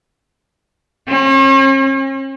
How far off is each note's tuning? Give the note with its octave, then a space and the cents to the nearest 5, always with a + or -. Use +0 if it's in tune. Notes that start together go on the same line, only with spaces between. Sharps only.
C#4 -45